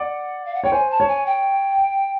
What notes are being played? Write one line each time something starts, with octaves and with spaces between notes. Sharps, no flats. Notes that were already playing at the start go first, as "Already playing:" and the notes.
Already playing: D5 F#5
F5
F#5
C#5 G5
C5 G#5
A5
C#5
G#5
G5